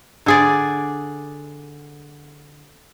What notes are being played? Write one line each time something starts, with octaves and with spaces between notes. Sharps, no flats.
D3 G#4 D5